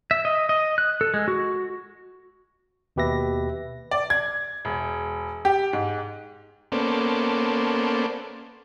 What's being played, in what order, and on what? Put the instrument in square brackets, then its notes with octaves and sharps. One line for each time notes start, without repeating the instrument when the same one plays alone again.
[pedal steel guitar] E5
D#5
D#5
F#6
A4
G#3
F#4
[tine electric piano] D#2 B2 G4 B4 E5 A#6
[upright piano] D5
G#6
E1
G4
G#2
[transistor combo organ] A#3 B3 C#4 A4 C5 D5